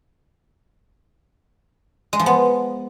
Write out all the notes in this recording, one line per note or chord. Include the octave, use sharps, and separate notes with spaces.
G#3
F3
B3